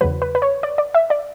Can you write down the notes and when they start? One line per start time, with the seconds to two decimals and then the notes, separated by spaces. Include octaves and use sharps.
0.01 E2 C#3 F#3 B4
0.22 B4
0.35 B4
0.42 C#5
0.63 D5
0.78 D5
0.94 E5
1.10 D5